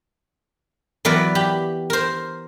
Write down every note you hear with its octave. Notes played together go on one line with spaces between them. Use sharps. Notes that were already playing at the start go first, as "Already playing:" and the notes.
E3 F#3 B3 A#4 B4 D5
G4 B5
A#4 C5